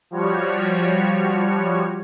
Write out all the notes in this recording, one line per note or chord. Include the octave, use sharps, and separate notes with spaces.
F3 G3 F#4 C#5